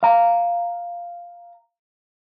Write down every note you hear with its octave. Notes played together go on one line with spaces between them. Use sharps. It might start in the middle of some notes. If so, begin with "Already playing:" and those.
F5 A#5